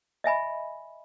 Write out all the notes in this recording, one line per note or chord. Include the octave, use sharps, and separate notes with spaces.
D#5 E5 G#5 B5